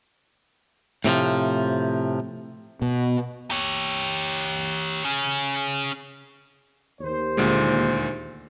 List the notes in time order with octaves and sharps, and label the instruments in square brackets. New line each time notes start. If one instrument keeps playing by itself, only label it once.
[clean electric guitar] A2 C3 E3 F3
[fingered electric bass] B2
[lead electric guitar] G4 C#5
C#4 G#4
[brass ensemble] D#2 C5
[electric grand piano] D2 A#2 G#3